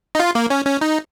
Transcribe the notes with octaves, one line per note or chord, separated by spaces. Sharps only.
D#4
F4
A#3
C#4
C#4
D#4